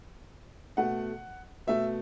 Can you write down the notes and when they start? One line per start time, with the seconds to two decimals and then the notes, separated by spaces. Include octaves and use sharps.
0.77 B2 A3 F#5
1.67 B2 A3 E5